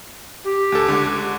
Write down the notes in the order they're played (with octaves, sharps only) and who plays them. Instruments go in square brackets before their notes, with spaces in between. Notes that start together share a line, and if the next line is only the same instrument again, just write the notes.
[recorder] G4
[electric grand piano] D2 A4
C#2 D3 D6